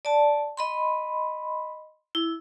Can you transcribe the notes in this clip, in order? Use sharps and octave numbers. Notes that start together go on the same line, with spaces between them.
D5 A5
D#5 B5 C6
E4